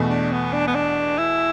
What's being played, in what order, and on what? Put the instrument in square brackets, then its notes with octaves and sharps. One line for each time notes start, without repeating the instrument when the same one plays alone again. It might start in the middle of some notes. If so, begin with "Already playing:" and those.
Already playing: [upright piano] E2 B2 A3
[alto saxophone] D4
B3
D4
B3
D4
E4